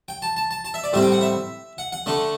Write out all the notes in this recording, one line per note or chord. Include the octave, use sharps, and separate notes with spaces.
G5
A5
A5
A5
A5
E5
D5
A2 G3 C4 E4 E5
G5
F#5
E5
F#5
F#5
D3 A3 D4